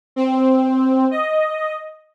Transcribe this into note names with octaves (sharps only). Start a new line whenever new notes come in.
C4
D#5